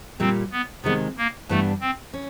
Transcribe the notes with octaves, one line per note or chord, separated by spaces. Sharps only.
A#2 G3 A#3 C4
B3
C3 D#3 G#3 B3
A#3
G2 E3 G3 A3 B3 D4
C4
C#4